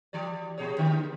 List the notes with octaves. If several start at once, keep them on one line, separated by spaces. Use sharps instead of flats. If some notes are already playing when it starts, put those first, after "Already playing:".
E3 G4 D5
A#2 G#4 C#5
D3 A#3